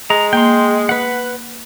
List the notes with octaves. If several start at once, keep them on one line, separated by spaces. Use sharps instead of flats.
G#3 A#5
A#3 G5 C6
B4 F#5